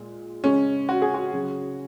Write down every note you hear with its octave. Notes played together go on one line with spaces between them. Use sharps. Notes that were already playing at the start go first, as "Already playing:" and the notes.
Already playing: A#2 G#3
C#3 G#3 C#4
F#4
G#4
F#4
C#3 F#3